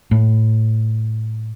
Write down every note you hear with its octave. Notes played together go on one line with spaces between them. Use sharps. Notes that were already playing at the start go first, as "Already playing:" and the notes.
A2